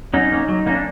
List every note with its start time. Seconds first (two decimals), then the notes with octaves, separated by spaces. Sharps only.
0.14 F#3 C#4 D#4
0.32 A#3 C#4
0.49 F#3
0.66 A#3 C#4 D#4
0.75 D4